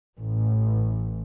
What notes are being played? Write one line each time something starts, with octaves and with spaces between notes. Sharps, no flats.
A1